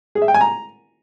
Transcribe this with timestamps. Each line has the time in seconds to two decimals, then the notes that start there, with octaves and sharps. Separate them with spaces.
0.15 G#4
0.22 E5
0.28 G5
0.34 G#5
0.41 A#5